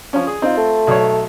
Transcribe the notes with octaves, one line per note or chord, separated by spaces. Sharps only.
F3 C#4
G#4
C4 D#4 F4
A3
B1 C#5